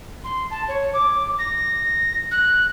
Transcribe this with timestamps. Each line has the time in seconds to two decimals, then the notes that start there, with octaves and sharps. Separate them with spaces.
0.24 C6
0.51 A5
0.68 C#5
0.93 D6
1.38 A#6
2.31 F#6